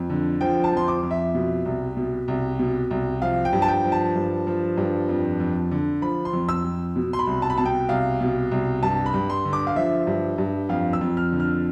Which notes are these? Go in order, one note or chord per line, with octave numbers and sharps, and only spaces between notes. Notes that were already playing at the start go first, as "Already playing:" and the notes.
Already playing: F2
D3
F3 G5
A5
F2 C6
D6
F2
E5
B2
C2
B2
C2
B2
C2
F3 F5
G5
G2
A5
G5
F3
A5
G2
F3
G2
F2
F2
D3
F3 B5
C6
F2
E6
F2
B2
C6
B5
C2
A5
B5
B2 A5
G5
C2 F5
B2
C2
G2 A5
B5
G2
C6
D3
D6
F5
F3 E5
G2
G2
F2 F5
E6
F2
F6
D3
F6